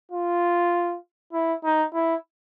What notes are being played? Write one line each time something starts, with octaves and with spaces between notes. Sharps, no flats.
F4
E4
D#4
E4